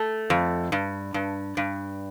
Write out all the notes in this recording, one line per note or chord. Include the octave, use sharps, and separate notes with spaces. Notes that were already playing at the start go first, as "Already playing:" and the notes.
Already playing: A3
F2
G2
G2
G2